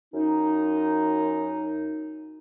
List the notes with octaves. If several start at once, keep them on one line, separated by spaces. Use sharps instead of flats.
F#2 D#4